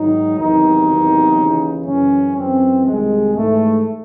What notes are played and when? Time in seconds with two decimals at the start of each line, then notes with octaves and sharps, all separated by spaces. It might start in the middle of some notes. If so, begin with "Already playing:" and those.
Already playing: G#2 D#3 F#3 D#4
0.38 E2 C3 D#3 F#3 D#4
0.87 E2 C3 D#3 F#3
1.37 D#2 C#3 E3
1.86 F#2 C#3 E3 C#4
2.35 F#2 C#3 E3 C4
2.85 C2 C3 D#3 G#3
3.35 G#2 E3 A3